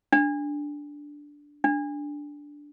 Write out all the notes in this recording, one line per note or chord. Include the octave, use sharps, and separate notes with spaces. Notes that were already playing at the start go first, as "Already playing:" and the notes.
D4
D4